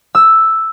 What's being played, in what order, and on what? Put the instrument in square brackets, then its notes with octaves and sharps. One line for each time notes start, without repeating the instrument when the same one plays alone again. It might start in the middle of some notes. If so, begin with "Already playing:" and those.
[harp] E6